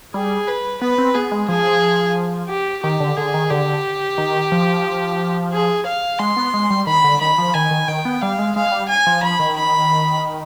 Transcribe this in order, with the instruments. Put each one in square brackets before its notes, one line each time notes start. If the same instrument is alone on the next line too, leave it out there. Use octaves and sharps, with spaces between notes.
[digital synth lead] G3 [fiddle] G#4
[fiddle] B4
[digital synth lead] B3 [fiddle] B4
[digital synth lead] C4
[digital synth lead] B3 [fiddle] G#4
[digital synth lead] G#3
[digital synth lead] F3 [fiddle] G#4
[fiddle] G4
[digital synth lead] D#3 [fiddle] G4
[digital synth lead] D3
[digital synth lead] D3 [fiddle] G#4
[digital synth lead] D#3
[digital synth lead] D3 [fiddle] G4
[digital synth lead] D#3
F3
[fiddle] G#4
F5
[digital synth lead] G#3 [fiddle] C6
[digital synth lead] B3
G#3
G3
[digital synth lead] D#3 [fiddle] B5
[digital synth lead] D3
[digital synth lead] D#3 [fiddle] B5
[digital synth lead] F3
[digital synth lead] D#3 [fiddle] G#5
[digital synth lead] D#3
[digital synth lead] D#3 [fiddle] G5
[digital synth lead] B3
[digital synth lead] G3 [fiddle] F5
[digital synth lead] G#3
[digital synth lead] G#3 [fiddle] F5
[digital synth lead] G3
[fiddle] G#5
[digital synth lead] F3
[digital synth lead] F3 [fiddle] B5
[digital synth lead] D#3
[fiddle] B5